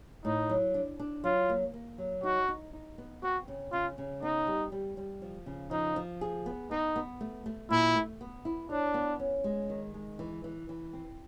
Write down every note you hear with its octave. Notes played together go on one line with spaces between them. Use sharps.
A2 D#4
F#3
D4
D4
F#3 F4
A#3
A#3
F#3
D#4 F#4
D#4
D#4
B3
C4 F#4
C#3
C#3 F4
C#3
B3 D#4
G3
G3
G3
F3
C#3
F3 D#4
F3
G#4
B3
B3 D#4
B3
A3
A3
A#2 E4
A3
B3
E4
D4 C#5
B3
C#4
G#3
D#3
G#3
E3
E3
E3
C4